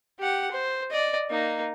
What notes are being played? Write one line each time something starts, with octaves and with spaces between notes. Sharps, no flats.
G4 F#5
C5
D5 D#5
A#3 D#4